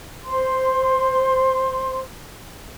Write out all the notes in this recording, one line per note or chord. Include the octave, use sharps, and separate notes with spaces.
C5 C6